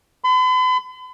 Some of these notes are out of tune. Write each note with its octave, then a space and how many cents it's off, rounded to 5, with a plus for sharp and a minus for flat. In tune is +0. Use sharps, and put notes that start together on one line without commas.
B5 +45